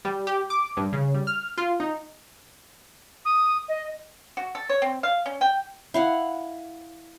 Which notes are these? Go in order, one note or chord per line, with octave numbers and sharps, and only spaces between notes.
G3
G4
D6
G2
C#3
G3
F6
F4
D#4
D#6
D#5
F#4
A4
C#5
C4
F5
C#4
G5
E4 F5 F#5